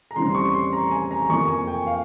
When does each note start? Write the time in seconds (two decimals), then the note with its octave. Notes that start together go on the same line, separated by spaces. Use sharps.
0.11 A#5
0.16 E2 C#3 E3 G3 C4 C6
0.29 C6
0.35 C#6
0.54 C6
0.73 A#5
0.91 G#5
1.11 A#5
1.29 F2 E3 A#3 C#6
1.48 G#5
1.67 G5
1.87 F5